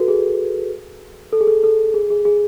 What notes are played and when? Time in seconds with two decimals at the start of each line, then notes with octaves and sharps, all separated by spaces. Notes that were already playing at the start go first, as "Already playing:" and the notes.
Already playing: F#4 A4 B4
0.08 G#4
1.32 A4
1.41 G#4
1.47 A4
1.64 A4
1.94 G#4
2.10 G#4
2.25 G#4